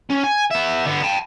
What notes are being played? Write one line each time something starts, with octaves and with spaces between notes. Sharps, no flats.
C#4
G#5
B3 E5
D3 B3
G5 A5